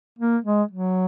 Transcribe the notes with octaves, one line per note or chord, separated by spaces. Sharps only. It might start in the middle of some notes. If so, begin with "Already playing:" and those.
A#3
G#3
F#3